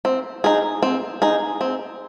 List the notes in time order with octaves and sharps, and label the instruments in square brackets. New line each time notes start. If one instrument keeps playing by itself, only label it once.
[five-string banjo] C4
D#4 G#4
C4
D#4 G#4
C4